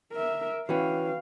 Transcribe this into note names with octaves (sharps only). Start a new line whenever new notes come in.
A#4 E5
E3 C#4 F#4 B4 F5 G5